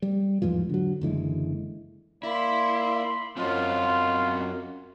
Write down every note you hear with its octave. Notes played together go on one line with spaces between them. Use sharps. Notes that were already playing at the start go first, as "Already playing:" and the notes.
G3
E2 G#2 E3 F3
D3 F#3
F#1 D3 E3 G#3
A#3 E4 D5 B5 C6
F#2 F#3 C4 C#4 F4 D#5